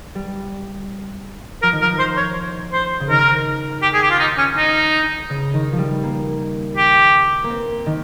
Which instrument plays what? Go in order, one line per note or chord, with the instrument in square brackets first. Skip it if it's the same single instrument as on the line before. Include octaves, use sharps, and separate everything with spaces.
[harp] G3
[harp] F3 [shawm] A#4
[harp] D#3
[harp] F3 [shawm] A#4
[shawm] C5
C#5
C5
[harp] C#3
[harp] D#3 [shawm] A#4
[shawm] G4
G#4
G4
F4
D#4
C#4
D#4
[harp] C#3
D#3
F3
G3
A#3
[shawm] G4
[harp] A#3
C4
D#3